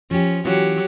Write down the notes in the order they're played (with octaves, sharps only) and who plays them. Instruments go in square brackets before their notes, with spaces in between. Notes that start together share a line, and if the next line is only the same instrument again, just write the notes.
[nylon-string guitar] F3 G4 [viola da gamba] C#4
[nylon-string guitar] E3 C#4 F4 [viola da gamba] F#3 G4